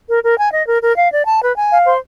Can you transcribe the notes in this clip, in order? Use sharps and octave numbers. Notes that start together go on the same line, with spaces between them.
A#4
A#4
G#5
D#5
A#4
A#4
F5
D5
A5
B4
G#5
F5
C5